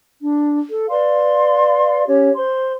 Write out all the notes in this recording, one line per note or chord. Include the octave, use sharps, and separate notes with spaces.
D4
A4
B4 D5 F5 C6
C#4 G4 C#5
C5 C6